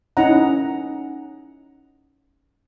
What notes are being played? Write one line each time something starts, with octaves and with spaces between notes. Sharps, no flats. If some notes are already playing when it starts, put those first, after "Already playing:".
C#4 D#4 E4 F#5 A#5